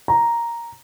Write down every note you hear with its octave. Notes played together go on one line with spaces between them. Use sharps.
A#5